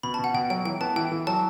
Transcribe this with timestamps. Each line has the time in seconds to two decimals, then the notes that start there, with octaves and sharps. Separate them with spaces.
0.03 B2 B5
0.14 A5
0.19 B2 F#5
0.34 B2 G5
0.50 F#3 G5
0.65 E3 G5
0.81 B3 A5
0.96 E3 G5
1.12 E3
1.27 F#3 A5